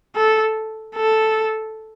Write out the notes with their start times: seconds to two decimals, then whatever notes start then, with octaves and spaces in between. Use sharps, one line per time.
0.16 A4
0.96 A4